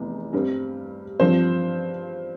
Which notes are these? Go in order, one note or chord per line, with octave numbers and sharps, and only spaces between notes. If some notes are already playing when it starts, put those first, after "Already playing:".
Already playing: F1 E2
G2 G3 C4
G2 F3 C4 C5